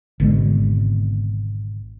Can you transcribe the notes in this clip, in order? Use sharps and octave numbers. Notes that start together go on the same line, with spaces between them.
G#1 B2 D3 G#3